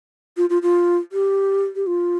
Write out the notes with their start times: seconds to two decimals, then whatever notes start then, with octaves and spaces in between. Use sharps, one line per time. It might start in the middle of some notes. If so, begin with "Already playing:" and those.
0.37 F4
0.50 F4
0.62 F4
1.12 G4
1.76 G4
1.87 F4